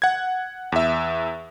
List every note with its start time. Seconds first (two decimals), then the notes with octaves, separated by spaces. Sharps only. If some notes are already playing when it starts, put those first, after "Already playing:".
0.02 F#5 G#6
0.72 E2 E5